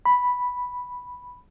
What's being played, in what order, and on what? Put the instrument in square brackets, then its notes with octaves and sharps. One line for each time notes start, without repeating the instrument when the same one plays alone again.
[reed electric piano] B5